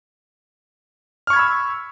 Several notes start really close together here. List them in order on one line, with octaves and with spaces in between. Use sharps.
F6 C#6 G#6 B5 E6